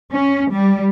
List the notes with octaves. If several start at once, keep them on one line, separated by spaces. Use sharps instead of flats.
C#4
G3